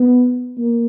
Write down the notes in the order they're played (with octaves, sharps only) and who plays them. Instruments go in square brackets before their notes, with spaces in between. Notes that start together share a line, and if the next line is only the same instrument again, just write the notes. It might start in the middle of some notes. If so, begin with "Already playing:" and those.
Already playing: [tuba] B3
A#3